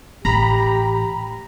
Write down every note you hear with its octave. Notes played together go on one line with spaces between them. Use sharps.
A1 G4 A#5 B5